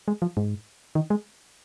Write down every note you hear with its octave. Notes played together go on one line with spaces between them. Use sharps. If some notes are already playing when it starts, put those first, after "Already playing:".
G#3
F3
G#2
D#3
G#3